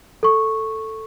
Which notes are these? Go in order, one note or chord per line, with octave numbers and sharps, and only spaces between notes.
A4 C#6